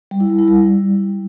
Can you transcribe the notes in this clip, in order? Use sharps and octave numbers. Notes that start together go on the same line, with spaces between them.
G3
E4
G3
E4
G3